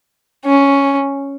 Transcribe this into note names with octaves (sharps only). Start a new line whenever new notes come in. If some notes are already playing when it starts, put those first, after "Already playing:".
C#4